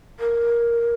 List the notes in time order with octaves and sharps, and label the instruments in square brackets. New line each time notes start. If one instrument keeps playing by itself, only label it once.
[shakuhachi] A#4